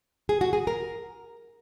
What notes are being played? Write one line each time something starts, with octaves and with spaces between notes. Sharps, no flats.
G#4
F#4
G#4
A#4